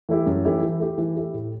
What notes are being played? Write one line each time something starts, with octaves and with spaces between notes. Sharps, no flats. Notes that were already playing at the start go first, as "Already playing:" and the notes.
E3 A3 E4 G4
F#2
E3 A3 E4 G4
E3
A3 E4 G4
E3
A3 E4 G4
A2